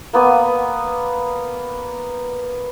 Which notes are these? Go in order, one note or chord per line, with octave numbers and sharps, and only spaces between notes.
A#3 B3 D5 G#5